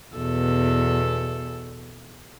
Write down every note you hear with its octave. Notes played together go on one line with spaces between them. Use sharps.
E2 B2 A4